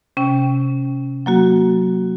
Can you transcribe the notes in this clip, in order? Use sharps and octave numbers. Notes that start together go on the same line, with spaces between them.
C3 C#4 G5
F#3 A#3 F#4